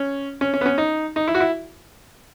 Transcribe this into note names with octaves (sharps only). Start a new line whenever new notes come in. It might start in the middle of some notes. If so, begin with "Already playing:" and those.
Already playing: C#4
C#4
C#4
B3
C#4
D#4
D#4
E4
F#4
E4